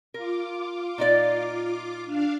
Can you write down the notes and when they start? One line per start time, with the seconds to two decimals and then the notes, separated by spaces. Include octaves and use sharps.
0.14 F4 A#4 D6
0.98 A#2 D#4 D5
2.06 D4 F5